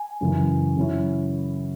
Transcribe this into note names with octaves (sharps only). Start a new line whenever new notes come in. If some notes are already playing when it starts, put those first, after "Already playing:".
Already playing: G#5
F#2 C#3 E3
C#3 F#3 C#4 E4